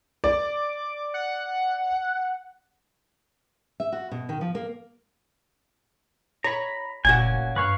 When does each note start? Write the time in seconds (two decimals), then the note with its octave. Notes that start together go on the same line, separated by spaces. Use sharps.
0.24 D5 D6
1.14 F#5
3.80 E5
3.92 F#4
4.11 B2
4.29 D#3
4.41 F3
4.55 A#3
6.44 C#5 A#5 B5
7.05 F#1 A#2 A#3 C#4 F#4 G#5
7.56 G2 B4 C#5 F5